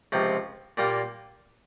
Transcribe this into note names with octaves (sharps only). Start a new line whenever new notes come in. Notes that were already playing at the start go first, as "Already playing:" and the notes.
C#2 C3 F3
A#2 G3 A#3